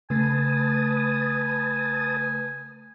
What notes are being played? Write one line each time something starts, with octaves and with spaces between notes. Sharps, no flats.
C#3 A3 B4 G#5 A5 D#6